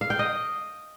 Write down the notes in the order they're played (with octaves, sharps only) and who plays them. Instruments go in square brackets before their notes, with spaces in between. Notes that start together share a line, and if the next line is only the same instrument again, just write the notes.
[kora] F5
G5
D#5